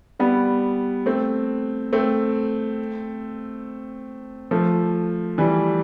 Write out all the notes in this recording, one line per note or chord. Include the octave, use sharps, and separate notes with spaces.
G3 B3
A3 C4
A3 C4
F3 A3
E3 G3